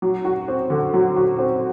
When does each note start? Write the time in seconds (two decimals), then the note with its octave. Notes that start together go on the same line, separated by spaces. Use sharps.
0.02 F#3
0.25 F#4
0.48 C4
0.70 D3
0.94 F#3
1.16 F#4
1.39 C4